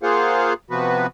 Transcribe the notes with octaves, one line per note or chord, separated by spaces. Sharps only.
A#3 F4 G#4 C5 F5 F#5
C3 F3 B3 F#4 B4